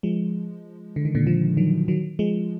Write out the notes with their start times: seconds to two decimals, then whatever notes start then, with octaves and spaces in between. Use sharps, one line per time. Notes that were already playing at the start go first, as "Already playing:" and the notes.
0.03 F3 G#3
0.96 D3
1.05 D#3
1.15 A#2 D3
1.27 D3 F3
1.57 D#3 F#3
1.88 D#3 F#3
2.19 F3 G#3